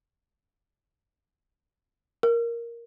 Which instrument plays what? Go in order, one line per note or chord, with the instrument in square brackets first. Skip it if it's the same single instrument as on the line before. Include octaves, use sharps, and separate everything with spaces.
[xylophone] A#4